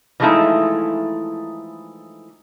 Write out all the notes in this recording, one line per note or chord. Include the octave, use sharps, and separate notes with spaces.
E3 F3 G#3 A3 D#4 E4